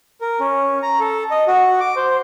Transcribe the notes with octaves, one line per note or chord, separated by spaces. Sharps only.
A#4
C#4
A#5
A4
D#5
F#4
D6
C5